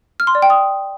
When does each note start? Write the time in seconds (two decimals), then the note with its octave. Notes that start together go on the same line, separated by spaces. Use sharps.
0.20 F6
0.27 C6
0.35 D5
0.42 G5
0.50 D#6